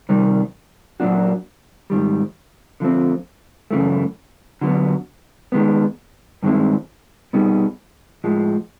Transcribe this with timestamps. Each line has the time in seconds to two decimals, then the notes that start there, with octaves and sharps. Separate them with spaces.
0.09 C3 D#3 G3
1.00 A#2 F#3 A#3 D4 F#4
1.90 G#2 D#3 G3
2.80 D3 F3 A3 C4
3.71 F#2 C#3 E3 A3
4.61 D3 F#3 B3
5.52 D#3 G#3 B3
6.43 G2 D#3 G#3 C4 E4
7.33 B2 G3 B3 D#4 G#4
8.24 A2 F3 G#3